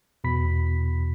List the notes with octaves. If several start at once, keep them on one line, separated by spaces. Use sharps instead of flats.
E2 B2 B5 B6